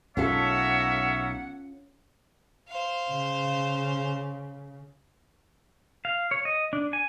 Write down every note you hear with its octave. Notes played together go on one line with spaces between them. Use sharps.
B1 A#3 C#4 F4 A4 C#5 E5 F#5
C5 F5
C#3
F5
C#5
D#5
D4
G#5